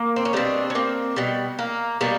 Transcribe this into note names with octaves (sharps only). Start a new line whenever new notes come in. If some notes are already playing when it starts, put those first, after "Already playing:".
Already playing: A#3
C4
C#4
B2 G3 C4 D4
C#4
A#3 C4
B2 G3
A#3
B2 G3 A#3